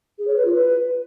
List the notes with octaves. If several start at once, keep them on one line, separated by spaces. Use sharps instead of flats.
G#4
C#5
B4
F4
B4